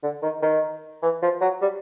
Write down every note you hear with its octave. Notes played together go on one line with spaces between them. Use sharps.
D3
D#3
D#3
E3
F3
F#3
G3